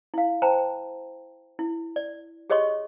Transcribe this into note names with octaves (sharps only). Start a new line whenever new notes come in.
E4 F5
C5 G5 A5 A#5
E4
D5
G4 G#4 C#5 D#5 C6 C#6